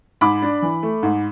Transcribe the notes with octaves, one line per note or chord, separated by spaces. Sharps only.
G#2 B5 D6
D4
E3
A3
G#2